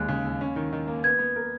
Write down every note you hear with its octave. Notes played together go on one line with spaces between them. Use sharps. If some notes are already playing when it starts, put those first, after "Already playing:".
Already playing: D#2 G#3 F#6
C#3
D#2
C#4
D#3
D#3
A#3
B3 G#6
B3
A#4